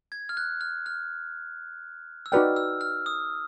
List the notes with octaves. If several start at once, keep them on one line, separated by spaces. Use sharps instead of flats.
G#6
F6
F#6
F6
F6
E6
D#4 F#4 B4 D5 G5 F6
E6
F6
D#6